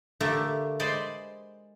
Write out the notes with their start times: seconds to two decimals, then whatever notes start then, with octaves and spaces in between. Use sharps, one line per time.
0.20 D3 A3 A#3 G4 E5
0.80 G#3 C5 D5 B5